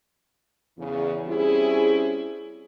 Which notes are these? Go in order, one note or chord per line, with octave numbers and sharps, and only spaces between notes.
E2 C#3 E3
G3 C4 C#4 E4 G#4